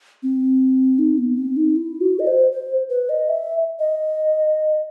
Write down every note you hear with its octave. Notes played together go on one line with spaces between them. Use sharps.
C4
D#4
B3
C4
D#4
E4
F#4
D#5
C5
C5
B4
D#5
E5
D#5